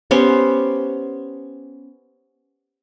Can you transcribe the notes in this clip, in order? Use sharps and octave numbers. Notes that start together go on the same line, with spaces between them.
B3 C#4 G4 C5